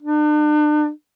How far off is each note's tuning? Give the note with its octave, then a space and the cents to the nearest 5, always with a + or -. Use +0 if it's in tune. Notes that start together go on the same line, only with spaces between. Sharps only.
D4 +40